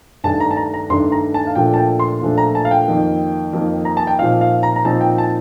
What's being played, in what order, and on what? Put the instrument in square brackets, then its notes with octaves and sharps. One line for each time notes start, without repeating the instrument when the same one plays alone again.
[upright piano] G2 D#3 A3 D4 A5
A#5
A5
A#5
A#5
G2 D#3 A3 D4 C6
A#5
A5
F5
A#2 F3 A3 D4 G5
A5
G5
C6
A#2 F3 A3 D4
A#5
A5
F5
G5
F2 D#3 A#3
F2 D#3 A#3
A#5
A5
G5
A#2 F3 C4 D#4 F5
F5
A#5
A#5
A#2 F3 C4 D#4 A5
G5
A5